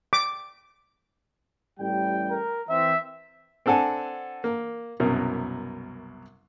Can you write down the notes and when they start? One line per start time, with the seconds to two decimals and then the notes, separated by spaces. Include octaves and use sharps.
0.13 D6
1.80 A1 G3 G5
2.31 A#4
2.69 E3 C4 E5
3.66 C4 D4 A4 F#5 G#5 A5
4.44 A#3
5.00 C2 F#2 B2 A#4